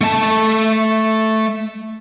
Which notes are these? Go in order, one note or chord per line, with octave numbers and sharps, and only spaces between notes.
A3 A5